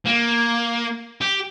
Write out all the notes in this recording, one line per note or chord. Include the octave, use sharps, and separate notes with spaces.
A#3
G4